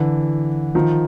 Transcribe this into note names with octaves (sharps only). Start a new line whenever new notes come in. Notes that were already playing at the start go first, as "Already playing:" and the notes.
Already playing: D3 E3
D#3 F3